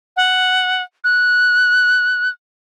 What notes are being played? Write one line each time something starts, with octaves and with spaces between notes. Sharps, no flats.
F#5
F#6